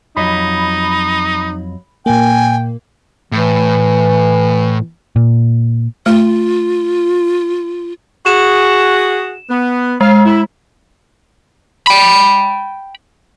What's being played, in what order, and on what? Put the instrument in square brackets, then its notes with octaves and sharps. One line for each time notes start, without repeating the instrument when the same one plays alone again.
[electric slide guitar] F2 F#3 D#5 [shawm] D#4 [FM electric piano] B5
[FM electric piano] A#2 A#3 [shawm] G5 [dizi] G#5
[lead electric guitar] A2 [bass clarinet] E3
[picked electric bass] A#2
[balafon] A3 [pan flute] F4
[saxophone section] F#4 G#4 [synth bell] E7
[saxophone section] B3
[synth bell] G#3 [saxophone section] F5
[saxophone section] E4
[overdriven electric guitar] G5 B5